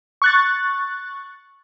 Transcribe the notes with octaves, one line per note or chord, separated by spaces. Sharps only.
C#6 F#6 A6